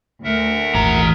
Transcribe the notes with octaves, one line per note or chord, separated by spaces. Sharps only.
D2 A#4 E5 F#5
D#1 G#1 E3 A#5